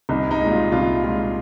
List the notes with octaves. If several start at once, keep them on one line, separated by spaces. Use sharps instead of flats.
C2 D#4
D#4
A#2 G#3
F4
C2 F4
A#2 G#3 F4